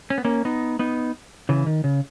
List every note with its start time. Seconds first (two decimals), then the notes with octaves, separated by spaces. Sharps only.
0.10 C#4
0.18 B3
0.25 A#3 C#4
0.45 B3 D#4
0.79 B3 D#4
1.49 C#3 E3
1.66 D#3
1.84 C#3